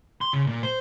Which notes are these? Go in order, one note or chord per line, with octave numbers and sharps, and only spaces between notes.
C6
C#3
A#2
C5